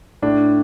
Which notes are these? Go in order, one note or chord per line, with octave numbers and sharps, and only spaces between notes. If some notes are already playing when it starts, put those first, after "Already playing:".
A2 D4